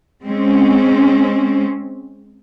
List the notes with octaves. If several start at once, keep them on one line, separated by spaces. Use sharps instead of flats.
G#3 C4 C#4